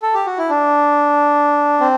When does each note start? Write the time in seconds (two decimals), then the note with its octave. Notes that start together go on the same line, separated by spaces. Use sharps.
0.03 A4
0.14 G4
0.26 F#4
0.38 E4
0.50 D4
1.80 C4